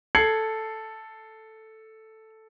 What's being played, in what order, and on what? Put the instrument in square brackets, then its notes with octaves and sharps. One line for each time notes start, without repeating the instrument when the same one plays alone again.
[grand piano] A4 G#6 C7 C#7 F#7